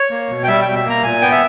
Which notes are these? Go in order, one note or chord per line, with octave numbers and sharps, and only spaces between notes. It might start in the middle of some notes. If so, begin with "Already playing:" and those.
Already playing: C#5
A#3
B2
G5
G3 E5
B2 G5
E5
A#3 A#5
A#2 G#5
B3 G5
E5